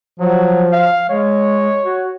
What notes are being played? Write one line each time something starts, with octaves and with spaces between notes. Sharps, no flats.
F3 F#3
F5
G#3 C#5
F#4